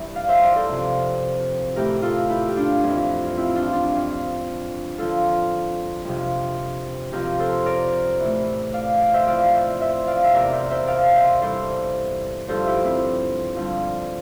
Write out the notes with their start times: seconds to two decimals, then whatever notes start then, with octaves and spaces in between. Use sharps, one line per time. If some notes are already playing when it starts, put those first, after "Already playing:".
Already playing: G2 E3
0.15 D5 F5
0.28 C5 E5
0.42 A#4 D5
0.56 A4 C5
0.69 F2 C3 F3
1.76 A2 E3 G4 A#4
2.02 F4 A4
2.29 E4 G4
2.48 G4
2.56 D4 F4
2.84 F2 E3
3.26 F4
3.37 C4 E4
3.55 D4 F4
3.73 D4 F4
3.91 F2 E3
4.98 F2 D3 F3 F4 A4
6.05 F2 C3 F3
7.12 F2 C3 F3 G4 A#4
7.39 A4 C5
7.66 A#4 D5
8.20 A2 E3
8.73 D5 F5
9.00 D5 F5
9.14 C5 E5
9.27 F2 E3 D5 F5
9.54 C5 E5
9.81 C5 E5
10.07 D5 F5
10.24 E5
10.33 E2 C3 E3 A#4 D5
10.52 C5 E5
10.70 C5 E5
10.87 D5 F5
11.15 C5 E5
11.41 G2 E3 A4 C5
12.48 G2 D3 F3 A4 C5
12.67 E4 G4
12.84 C4 E4
13.56 G2 D3 F3